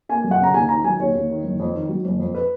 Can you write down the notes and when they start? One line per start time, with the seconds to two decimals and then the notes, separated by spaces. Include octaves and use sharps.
0.09 A#3 G#5
0.24 F#2
0.31 F#5
0.39 C#3 A#5
0.54 D#2 G#5
0.69 D#3 A#5
0.84 F#3 G#5
0.99 D#2 C#5
1.15 D#2
1.30 D#3
1.44 F#1
1.60 F2
1.75 D#3
1.89 F#3
2.05 F#1
2.20 F2
2.35 B4